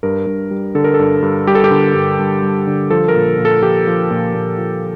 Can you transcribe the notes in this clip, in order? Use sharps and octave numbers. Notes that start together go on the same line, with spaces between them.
G2 A#4
G2
G3
D3 A4
A#4
A4
G2
G2
G3 G4
A4
G4
D3
G2
G2
G3
D3
F3 A4
A#4
A#2
A#2
A4
F3 G4
F3
A#2
A#2
F3